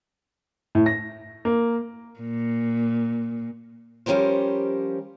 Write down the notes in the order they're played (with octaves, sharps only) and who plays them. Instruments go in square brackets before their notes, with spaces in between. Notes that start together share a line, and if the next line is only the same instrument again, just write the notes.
[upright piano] A2
A#6
A#3
[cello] A#2
[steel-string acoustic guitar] F3 G3 C#4 G4 A#4 C5